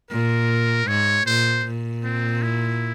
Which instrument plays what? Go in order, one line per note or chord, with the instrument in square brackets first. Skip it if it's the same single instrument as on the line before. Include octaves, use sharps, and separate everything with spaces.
[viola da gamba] A#2 [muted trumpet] A#4
[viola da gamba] G#2 [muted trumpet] C#5
[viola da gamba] A#2 [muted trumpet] C5
[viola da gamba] A#2
[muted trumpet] C4
E4